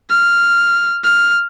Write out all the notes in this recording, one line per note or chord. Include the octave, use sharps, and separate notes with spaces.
F6
F6